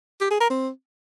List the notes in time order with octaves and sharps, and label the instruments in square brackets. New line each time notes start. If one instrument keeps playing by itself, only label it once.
[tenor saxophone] G4
G#4
A#4
C4